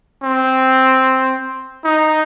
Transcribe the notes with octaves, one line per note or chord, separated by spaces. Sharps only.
C4
D#4